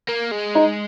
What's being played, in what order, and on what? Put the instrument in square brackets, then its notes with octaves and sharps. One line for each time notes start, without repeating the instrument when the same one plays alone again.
[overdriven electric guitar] A#3
G#3
[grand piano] D#4